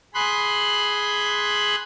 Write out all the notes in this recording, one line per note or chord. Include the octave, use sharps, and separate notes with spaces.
G#4 B5 C6 F#6